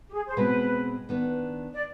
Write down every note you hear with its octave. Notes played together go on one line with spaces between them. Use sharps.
G4
G#4
C5
B2 G#3 C4 B4
D#3 B3 D4
D5